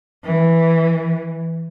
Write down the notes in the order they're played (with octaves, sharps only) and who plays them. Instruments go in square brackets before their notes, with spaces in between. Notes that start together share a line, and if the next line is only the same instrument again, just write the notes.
[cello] E3